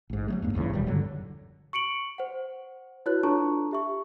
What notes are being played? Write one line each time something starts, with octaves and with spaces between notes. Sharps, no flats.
A1 G#2
F#3 G#3 A3
E2 G2 A#3
G1 E2 G#2 C#3
D#1 B2 D#3 G3
G2 A#2 D3 F#3
C#6 C#7 D7 F#7
C5 F#5
E4 F#4 B4 C#5 F#6
D4 F4 A4 A5 A#5 C#6
G4 E5 C#6